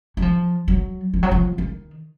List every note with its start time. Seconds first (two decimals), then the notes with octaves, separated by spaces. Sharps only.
0.17 F#3
0.22 F3
0.68 F#3
1.13 F3
1.23 F#3
1.31 F3
1.58 D#3